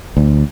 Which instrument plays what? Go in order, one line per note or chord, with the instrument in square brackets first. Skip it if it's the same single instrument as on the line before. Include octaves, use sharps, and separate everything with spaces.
[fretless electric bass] D2